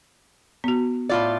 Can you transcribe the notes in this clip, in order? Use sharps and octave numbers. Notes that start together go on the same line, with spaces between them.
B3 F#4
A2 F4 D5